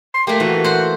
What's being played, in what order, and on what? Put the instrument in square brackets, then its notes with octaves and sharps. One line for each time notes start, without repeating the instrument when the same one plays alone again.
[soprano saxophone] C6
[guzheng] A3 A#3 [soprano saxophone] G4
[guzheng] E3 [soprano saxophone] F#4
[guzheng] C5 F#5